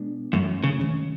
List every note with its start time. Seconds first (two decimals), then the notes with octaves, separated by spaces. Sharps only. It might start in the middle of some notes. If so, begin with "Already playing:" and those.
Already playing: B2 G#3 B3 D4
0.33 F#2 E3 A3 C#4
0.64 C#3
0.80 D#3 G#3 C#4